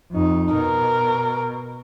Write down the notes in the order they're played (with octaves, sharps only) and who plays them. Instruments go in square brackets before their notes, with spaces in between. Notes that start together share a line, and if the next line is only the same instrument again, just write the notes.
[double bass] F2 D#4
[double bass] B2 [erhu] A#4